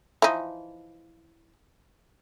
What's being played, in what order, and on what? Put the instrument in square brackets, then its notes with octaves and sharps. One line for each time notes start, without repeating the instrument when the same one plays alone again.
[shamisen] E3 F3 D#4